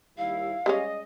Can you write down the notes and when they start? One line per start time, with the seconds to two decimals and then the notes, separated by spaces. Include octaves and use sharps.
0.18 D#2 G3 E4 F5
0.66 G3 G#3 C#4 D#5